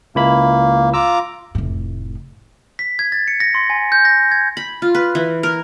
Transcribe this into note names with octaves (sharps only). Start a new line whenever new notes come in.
C#2 A#3 E4 B5
F4 A#5 D6 E6
F1 A2
B6
G#6
A6
C#7
A#6
C6
G#5
G6
A#6
G#6
B5
F4
B4
E3
A#4